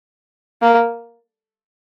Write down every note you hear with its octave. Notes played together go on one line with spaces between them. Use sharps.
A#3